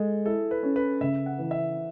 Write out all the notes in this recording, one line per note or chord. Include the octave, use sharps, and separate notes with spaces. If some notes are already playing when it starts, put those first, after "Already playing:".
Already playing: G#3 G#4 A4
E4 A4
B4
C#4
B4
C#3 E5
F#5
E3
E5